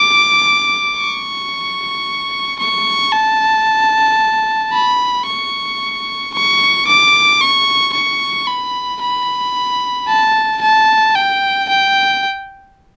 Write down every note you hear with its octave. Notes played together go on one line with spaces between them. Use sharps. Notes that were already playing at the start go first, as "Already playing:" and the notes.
Already playing: D6
C#6
C#6
A5
B5
C#6
C#6
D6
C#6
C#6
B5
B5
A5
A5
G5
G5